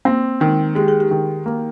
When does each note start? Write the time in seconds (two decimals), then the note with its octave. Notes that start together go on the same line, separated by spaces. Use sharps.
0.05 A#3 C4
0.40 D#3 G#3
0.75 G#3 G4
0.88 G#4
1.00 G4
1.11 D#3
1.46 A#3